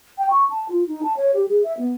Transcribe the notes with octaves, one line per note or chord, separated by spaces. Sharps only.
G5
C#6
A5
F4
D#4
A5
C#5
G4
G#4
E5
B3